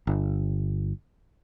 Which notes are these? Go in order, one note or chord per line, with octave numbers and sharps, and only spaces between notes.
G1